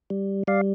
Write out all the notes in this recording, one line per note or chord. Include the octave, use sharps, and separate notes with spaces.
G3
G3 D5 F5